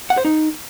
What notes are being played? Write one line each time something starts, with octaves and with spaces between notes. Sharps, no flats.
F#5
C5
D#4